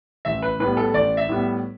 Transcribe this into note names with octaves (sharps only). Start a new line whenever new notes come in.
A1 E5
B4
A2 G3 B3 B4
A4
A1 D5
E5
A2 G3 B3